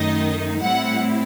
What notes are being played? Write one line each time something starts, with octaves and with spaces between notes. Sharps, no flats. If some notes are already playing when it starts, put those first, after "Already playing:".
Already playing: F#2 D#3 A3 D#4 D#5
A2 G3 C4 E4 F#5